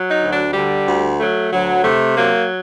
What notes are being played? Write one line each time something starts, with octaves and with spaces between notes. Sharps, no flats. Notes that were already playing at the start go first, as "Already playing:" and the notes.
Already playing: F#3
D#4
D2
D4
D3 G3
D2
F#3 A3
D2 F#3
C3 A3
F#3 A#3